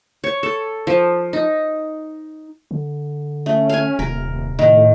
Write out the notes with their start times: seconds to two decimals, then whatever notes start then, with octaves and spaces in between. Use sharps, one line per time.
0.24 C#5
0.43 A4
0.87 F3
1.33 D#4
2.71 D3
3.46 A3 C#4
3.69 F5 G#5
3.99 D#1 C3 A#4
4.59 A2 D#3